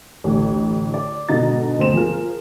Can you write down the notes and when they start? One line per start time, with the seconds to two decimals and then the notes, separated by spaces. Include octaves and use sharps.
0.24 A1 D2
0.94 D5
1.29 G#2 B2 D3 D#5 A#5 A6
1.79 D2 C4 E7
1.93 F3 G#4 A#4